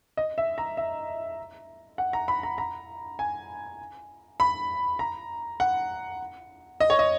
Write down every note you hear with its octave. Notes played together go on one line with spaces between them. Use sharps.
D#5
E5
A#5
E5
F#5
A#5
B5
A#5
A#5
G#5
B5
A#5
F#5
D#5
C#5
D#5